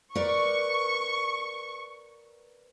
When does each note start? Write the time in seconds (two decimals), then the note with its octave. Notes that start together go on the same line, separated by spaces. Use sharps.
0.15 A#4 B4 D5 C#6